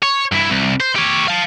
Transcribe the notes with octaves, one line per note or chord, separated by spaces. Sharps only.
C#5
G2 E4
C2
C5
G4 C#5
F5 A5